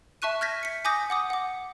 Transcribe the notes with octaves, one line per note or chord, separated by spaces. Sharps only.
E5 A5 C#6 F#6 D#7
F6 G6 G#6 A#6 B6
B6 C#7
G#5 D6 D#6 G6 A#6
F#5 D6 D#6
F#5 D6